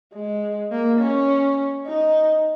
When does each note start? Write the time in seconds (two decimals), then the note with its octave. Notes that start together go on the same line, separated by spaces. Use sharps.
0.13 G#3
0.72 A#3
1.00 C#4
1.87 D#4